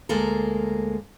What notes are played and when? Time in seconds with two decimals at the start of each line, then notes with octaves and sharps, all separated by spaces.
0.09 D2 G#3 A#3 A4 A#4